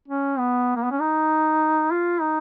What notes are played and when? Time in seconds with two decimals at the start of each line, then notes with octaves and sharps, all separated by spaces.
0.08 C#4
0.39 B3
0.75 A#3
0.83 B3
0.91 C#4
1.00 D#4
1.91 F4
2.21 D#4